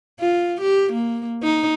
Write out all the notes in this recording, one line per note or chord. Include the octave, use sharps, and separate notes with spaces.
F4
G4
A#3
D#4